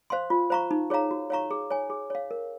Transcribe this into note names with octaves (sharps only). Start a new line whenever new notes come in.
C5 F5 C6
F4
C5 F5 A#5 C#6
D#4
G#4 C#5 F5 A#5
F#4
C#5 F5 A#5 C#6
G#4
C#5 G#5
G#4
C#5 F5
A#4